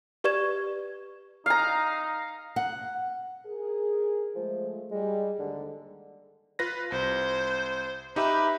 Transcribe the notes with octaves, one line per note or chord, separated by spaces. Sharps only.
G4 B4 D5 C#6 G#6 E7
D#4 F5 A#5
F#5
G#4 A#4
F3 G#3 A3
G3 G#3
D#2 G#2 D3
F4 B4 A#6
C2 C5
D#4 G4 B4 E5